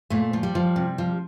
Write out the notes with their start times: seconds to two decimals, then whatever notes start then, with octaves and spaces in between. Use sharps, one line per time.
0.10 A#2 A3
0.33 F3
0.43 G3
0.55 F3
0.76 C3
0.98 F3